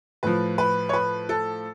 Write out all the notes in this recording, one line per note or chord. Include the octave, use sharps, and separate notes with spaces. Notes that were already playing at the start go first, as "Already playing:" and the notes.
A2 F3 B4
B4
C#5
B4
A4